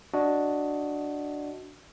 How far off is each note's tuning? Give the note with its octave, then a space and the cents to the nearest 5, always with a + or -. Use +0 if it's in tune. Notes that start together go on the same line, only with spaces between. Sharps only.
D4 +0 F#4 +0 D#5 +15